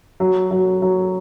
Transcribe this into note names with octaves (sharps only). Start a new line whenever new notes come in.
F#3
F#3
F#3